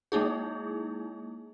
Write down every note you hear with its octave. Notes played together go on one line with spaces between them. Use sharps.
G#3 A#3 D#4 E4 G#4